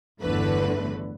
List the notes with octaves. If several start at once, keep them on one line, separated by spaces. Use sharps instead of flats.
G1 E2 A2 D3 A3 B4